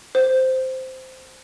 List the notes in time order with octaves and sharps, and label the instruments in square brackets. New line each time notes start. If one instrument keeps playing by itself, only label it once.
[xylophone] C5